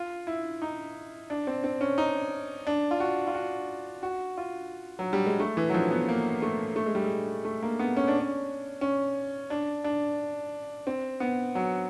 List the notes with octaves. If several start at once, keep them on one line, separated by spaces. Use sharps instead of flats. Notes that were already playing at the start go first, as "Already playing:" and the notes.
Already playing: F4
E4
D#4
D4
C4
C4
C#4
D#4
D4
F4
F#4
F4
F#4
F#4
F4
F#3
G3
G#3
A3
E3
F#3
F3
B3
A#3
A3
A3
G#3
G3
G#3
A3
A#3
B3
C#4
D4
C#4
C#4
D4
D4
C4
B3
F#3